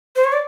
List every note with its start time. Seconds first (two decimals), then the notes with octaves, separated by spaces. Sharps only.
0.16 C5
0.24 C#5
0.33 D5